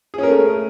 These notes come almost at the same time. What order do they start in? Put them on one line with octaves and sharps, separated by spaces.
G#4 C#4 A#4 A3